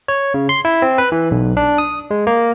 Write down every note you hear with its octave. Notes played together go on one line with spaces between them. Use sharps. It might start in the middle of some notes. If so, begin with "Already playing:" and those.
C#5
C#3
C6
E4
C4
B4
E3
B1
D4
D#6
G#3
A#3